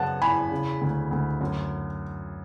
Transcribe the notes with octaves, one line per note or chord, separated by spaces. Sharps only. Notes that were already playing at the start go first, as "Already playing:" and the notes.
Already playing: F#2 C#3 B3 F#5 A5
E2 G#5 B5
C#3
D2
D2
F#2